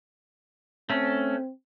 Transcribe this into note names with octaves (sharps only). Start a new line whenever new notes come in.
A3 C4 C#4